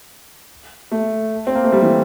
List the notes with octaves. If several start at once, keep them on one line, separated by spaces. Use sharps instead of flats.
A3
C4
A#3
A3
G3
E3